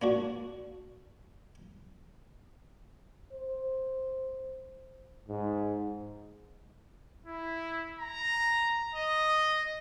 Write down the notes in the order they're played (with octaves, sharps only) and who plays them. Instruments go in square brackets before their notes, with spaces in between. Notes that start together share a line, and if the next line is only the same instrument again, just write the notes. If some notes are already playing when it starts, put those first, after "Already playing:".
[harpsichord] A#3 D4 F#4
[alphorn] C5
[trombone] G#2
[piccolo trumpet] E4
A#5
D#5